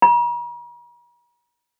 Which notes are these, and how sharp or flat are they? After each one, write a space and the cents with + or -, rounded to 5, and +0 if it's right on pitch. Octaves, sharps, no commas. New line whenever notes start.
A#5 +45